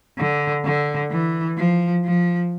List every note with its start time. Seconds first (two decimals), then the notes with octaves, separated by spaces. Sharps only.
0.18 D3
0.65 D3
1.11 E3
1.58 F3
2.04 F3